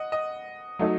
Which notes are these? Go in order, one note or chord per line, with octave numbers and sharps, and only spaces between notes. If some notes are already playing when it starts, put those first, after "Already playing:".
Already playing: D#5 F#5
D#5
F#3 A3 D#4